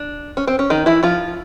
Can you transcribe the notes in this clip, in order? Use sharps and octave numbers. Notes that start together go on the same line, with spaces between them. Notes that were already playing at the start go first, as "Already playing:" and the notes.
Already playing: D4
C#4
C4
C#4
D#3 D#4
E3 E4
F3 F4